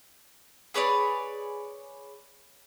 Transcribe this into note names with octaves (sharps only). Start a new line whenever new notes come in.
G#4 B4 C#5 D5